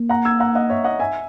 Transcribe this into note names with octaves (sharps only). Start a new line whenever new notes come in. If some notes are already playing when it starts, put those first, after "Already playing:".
Already playing: A#3
F#5 A#5
E6 G#6
F#5 A#5
D#5 F#5
C#5 E5
D#5 F#5
E5 G#5